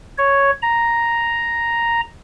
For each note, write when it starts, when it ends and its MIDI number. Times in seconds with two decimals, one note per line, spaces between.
0.18 0.51 73
0.62 2.01 82